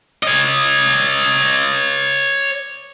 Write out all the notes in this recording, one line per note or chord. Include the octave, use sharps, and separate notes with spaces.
C#5 D#5